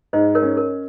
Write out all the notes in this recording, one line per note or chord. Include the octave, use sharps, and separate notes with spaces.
G#2 C5 D#5
A#4 C#5
C#4
A#4